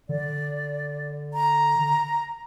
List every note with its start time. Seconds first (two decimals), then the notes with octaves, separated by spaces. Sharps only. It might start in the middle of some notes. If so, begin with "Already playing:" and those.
0.09 D3 D5
1.34 A#5